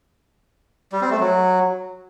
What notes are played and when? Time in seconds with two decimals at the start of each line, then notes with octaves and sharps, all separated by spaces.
0.92 G3
1.02 C4
1.11 A3
1.20 F#3